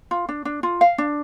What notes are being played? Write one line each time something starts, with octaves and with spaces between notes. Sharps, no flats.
F4
D4
D4
F4
F5
D4